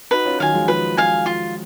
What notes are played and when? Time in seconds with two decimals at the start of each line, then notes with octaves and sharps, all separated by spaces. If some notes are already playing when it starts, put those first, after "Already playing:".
0.11 D#4 F#4 B4
0.25 C#4 F4
0.40 D#3 F#3 F5 G#5
0.53 F3 G#3
0.68 F3 G#3 B4
0.97 F5 G#5
1.26 F4